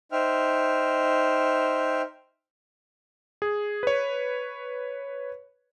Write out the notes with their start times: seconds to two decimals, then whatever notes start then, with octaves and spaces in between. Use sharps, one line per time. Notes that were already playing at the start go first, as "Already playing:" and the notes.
0.12 D#4 C5 E5 G5 F6
3.42 G#4
3.83 B4 C#5